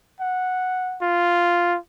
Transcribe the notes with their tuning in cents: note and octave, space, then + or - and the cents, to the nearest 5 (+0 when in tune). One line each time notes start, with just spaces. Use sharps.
F#5 -5
F4 -5